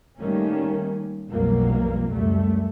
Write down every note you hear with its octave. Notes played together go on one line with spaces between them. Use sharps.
D#3 G3 A3 A#3 C#4
B1 F2 B2 F#3 G3 A#3
C#2 F#2 G3 A3